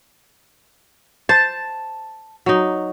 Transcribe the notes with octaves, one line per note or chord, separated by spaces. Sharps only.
C5 A5
F#3 D#4